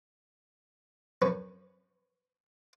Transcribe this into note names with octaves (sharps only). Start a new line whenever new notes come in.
F#2 C#4 B4 C#6